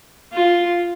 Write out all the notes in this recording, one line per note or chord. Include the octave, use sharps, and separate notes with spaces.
F4